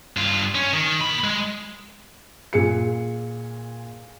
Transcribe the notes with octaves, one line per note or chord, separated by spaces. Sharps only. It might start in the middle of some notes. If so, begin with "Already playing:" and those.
G2 F4
C#4
D#3
A#2 B5
G#3
A#2 G#4 C#7